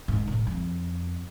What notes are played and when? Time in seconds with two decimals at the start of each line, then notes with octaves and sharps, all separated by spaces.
0.08 G#2
0.28 A2
0.47 F2